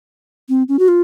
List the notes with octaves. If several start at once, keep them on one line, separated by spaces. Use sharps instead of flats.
C4
C#4
F#4
F4